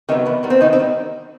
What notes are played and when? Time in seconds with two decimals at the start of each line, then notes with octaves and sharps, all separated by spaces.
0.09 C3 D#3 F#3 B3 D#4
0.26 E2 B3
0.43 D#3 G3 B3
0.50 C4
0.61 E2 D#3 D#4
0.73 C4
0.79 D#3 G3 B3